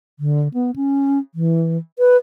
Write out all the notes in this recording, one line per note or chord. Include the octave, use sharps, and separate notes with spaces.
D3
B3
C#4
E3
B4